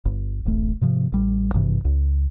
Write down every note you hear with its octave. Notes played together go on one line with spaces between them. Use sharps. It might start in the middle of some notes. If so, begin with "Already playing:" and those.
G1
D1 A1 A3
G#2 C3 F3
A1 G3
G#1 G2 C3 E3
C#2